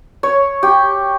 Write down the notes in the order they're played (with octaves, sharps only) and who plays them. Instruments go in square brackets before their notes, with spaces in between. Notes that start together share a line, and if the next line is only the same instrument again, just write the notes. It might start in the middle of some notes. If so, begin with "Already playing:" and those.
[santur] C#5
G4